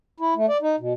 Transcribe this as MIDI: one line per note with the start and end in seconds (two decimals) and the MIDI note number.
0.20 0.34 64
0.36 0.46 57
0.49 0.57 74
0.62 0.76 63
0.80 0.93 47